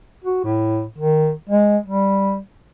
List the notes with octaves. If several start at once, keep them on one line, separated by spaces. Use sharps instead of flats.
F#4
A2
D#3
G#3
G3